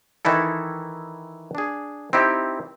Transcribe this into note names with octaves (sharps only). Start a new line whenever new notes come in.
D#3 E3 D#4 E4 A4
D4 G#4
C4 D#4 E4 G4